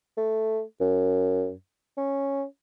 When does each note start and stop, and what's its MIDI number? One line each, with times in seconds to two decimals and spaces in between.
0.18 0.61 57
0.81 1.52 42
1.97 2.44 61